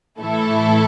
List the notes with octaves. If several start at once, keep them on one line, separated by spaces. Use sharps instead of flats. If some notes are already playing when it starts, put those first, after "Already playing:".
A2 E3 A3 E4 A4